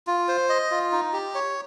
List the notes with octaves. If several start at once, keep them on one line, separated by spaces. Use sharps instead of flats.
F4
C5
D#5
F4
D#4
G4
C#5